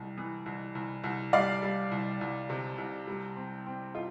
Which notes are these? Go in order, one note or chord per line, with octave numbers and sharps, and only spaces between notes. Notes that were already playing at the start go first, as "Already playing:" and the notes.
Already playing: C2 G3
E3
C2
C2
C2
G3 D5 F5
G3
C2
C2
C3
C2
G3
C4
C4
F4